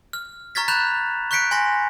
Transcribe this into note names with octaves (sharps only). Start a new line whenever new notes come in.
F6
A#5 C#6 F6 G#6 A6 B6
B5 F#6 G6 A6 E7 F7
C#6 F#6 G6 B6 C#7 D7
G#5 C6 A#6